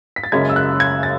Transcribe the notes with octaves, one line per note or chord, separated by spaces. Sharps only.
B6
A6
F#1 F#2 C#3 G#3 G#6
E6
F#6
G#6
A6